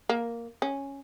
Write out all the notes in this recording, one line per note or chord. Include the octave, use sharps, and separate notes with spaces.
A#3
C#4